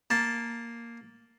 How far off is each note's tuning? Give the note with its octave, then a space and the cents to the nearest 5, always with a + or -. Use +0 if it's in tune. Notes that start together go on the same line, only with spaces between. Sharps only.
A#3 +0 A5 +0